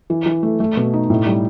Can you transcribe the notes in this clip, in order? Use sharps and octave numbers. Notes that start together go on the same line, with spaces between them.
E3
E3
A3
A3
B2
D#4
A2
G3